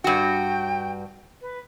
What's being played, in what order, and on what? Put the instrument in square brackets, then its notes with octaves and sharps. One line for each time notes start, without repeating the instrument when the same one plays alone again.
[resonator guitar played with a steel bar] G2 F#4 [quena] G5
[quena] B4